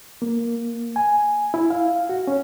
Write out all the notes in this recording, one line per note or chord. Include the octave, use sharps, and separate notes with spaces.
A#3
G#5
E4
F5
F#4
C#4